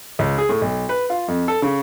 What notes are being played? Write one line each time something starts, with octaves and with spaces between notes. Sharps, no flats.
C#2
G#4
A2
B1
B4
F4
F2
A4
C#3